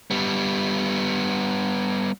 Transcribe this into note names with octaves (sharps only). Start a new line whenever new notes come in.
G3 B3